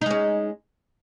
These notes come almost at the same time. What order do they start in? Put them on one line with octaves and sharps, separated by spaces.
D#4 G#3 C#4